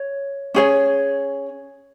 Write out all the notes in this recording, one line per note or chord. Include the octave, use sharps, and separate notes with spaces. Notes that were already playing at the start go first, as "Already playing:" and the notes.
Already playing: C#5
C#4 G#4 C#5